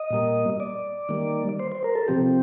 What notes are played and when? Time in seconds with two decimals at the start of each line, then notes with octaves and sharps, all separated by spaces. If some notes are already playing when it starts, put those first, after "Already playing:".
Already playing: D#5
0.10 A#2 G3 A#3
0.60 D5
1.09 D#3 G3 A#3
1.60 C5
1.72 C5
1.84 A#4
1.95 A4
2.08 C3 F3 C4 G4